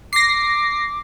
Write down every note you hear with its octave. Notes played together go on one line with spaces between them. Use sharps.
D6 A#6 C7